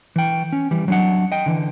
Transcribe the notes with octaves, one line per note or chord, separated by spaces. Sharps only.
E3 G5
C#4
E3 G3
F#3 D4 F#5
D#5 G5
D3 E3